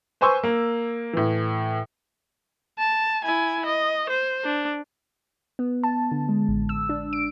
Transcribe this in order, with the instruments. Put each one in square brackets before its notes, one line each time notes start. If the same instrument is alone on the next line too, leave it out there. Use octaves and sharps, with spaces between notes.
[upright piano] B4 C5 G#5 C6 C#6 E6
A#3
A2 E3
[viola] A5
E4 G#5
D#5
C5
D4
[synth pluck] B3
A5
D3
G#3
A1
E6
D4
D7